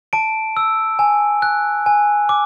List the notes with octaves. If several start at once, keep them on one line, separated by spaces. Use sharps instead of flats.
A5 D7
E6
G#5
F#6
G#5
D6